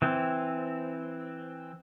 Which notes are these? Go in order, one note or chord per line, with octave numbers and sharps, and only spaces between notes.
E3 C4